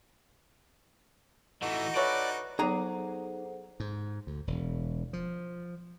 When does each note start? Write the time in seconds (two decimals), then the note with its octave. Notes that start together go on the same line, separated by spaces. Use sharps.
1.62 E3 A3 D#4 F#4
1.96 A4 B4 C#5 D5 E5
2.59 F#3 B3 D#4 G#4 A4 C5 F#5 A#5
3.80 G#2
4.27 D2
4.47 E1
5.13 F3